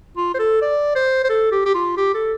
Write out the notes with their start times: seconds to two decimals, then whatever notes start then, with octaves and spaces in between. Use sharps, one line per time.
0.17 F4
0.35 C5
0.39 A4
0.62 D5
0.96 C5
1.24 C5
1.30 A4
1.52 G4
1.66 G4
1.74 F4
1.97 G4
2.14 A4